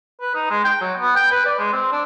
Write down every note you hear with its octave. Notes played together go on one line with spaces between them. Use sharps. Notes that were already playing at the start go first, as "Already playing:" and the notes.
B4
D#4
G#3
G5
F#3
B3
G5
B4
D5
G#3
C4
D4